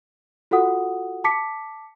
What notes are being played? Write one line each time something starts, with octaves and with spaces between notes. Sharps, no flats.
F4 F#4 A4 F#5 D#6
A5 D6 B6 C#7